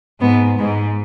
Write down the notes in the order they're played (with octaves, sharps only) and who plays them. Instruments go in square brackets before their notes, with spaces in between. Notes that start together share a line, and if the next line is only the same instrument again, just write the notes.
[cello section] G#2 [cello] B3
[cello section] G#2 [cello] G#3